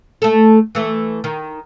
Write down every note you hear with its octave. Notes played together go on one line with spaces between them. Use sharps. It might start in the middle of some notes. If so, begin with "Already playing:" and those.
A3 A4
E3 A3
D#3